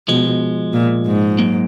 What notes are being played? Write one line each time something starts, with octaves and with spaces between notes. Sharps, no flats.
B2 F3 G#3
A#2
G#2
F#3 A#3